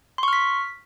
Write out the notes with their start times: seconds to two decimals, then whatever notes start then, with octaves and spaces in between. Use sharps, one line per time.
0.18 C6
0.23 C#6
0.28 F6
0.33 B6